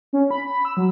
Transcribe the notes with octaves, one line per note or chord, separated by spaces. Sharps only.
C#4
B5
B5
E6
F#3